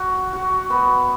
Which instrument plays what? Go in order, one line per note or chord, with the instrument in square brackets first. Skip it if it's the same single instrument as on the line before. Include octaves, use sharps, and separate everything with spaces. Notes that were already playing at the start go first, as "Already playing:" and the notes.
Already playing: [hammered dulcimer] F#4
F#4
B3